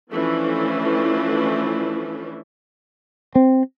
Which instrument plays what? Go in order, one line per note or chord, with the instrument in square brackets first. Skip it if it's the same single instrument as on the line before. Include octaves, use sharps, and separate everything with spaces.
[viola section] E3 F3 A3 C#4 D4
[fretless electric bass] C4